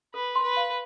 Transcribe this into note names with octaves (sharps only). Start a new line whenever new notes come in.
A4 B4
C6
B4
F5